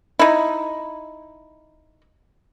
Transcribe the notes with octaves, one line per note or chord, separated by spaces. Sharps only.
D#4 E4